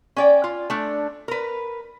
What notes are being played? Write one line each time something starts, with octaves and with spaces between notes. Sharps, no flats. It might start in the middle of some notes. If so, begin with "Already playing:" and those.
C#4 D5 G5
F4
A3 D4
A#4 B4